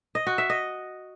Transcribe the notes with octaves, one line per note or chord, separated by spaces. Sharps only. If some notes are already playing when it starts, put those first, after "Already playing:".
D#5
F#4
E5
D#5